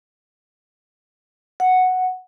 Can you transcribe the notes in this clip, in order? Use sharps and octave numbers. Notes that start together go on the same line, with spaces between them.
F#5